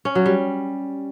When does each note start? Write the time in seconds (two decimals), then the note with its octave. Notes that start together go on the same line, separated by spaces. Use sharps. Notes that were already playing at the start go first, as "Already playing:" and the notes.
0.05 C#4
0.15 F#3
0.26 G3